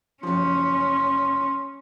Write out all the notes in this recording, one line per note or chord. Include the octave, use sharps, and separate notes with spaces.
F#1 F3 C#4 C6